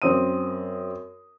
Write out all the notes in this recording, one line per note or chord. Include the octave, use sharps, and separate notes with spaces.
F#2 C4 D#6 D#7